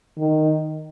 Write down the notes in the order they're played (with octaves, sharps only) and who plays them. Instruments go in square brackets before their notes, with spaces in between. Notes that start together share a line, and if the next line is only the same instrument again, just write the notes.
[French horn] D#3